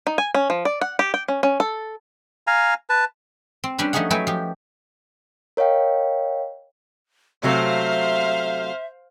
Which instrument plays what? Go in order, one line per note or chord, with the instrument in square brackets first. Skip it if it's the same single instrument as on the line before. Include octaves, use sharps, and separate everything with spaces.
[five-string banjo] D#4
G#5
C#4
F3
D5
F#5
G4
G5
C#4
C#4
A4
[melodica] F5 G#5 A#5
B4 A5
[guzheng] C4
G3 C#4 D4 B4
F3 A3 C#4 D#4 G#4 F#5
F#3 A3 B4 G5 G#5
F3 G4
[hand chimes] A#4 C#5 D#5 F5 G5
[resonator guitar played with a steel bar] C3 F#3 A3 [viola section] C5 F5 [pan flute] E5